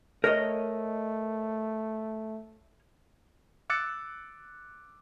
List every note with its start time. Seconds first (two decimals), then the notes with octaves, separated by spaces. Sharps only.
0.24 A3 A#4 C#5 D#5
3.70 D6 E6 F#6 A6 C#7